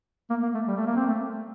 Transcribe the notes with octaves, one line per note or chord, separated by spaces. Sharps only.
A#3
A#3
A3
G3
A3
A#3
C4
A3